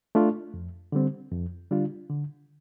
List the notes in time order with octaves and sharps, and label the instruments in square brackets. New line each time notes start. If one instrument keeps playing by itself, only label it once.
[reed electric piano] A3 D4 F4
F2
D3 G3 C4
F2
D3 G3 D4 F4
D3